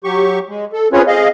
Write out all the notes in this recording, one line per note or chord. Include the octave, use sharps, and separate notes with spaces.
F#3 G4 C#6
G#3
A4
C4 C#4 F4 G#4 B4 C#5
C4 G#4 D#5 F5